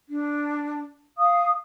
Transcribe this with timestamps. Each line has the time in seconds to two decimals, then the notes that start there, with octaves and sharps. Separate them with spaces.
0.09 D4
1.17 F5 D#6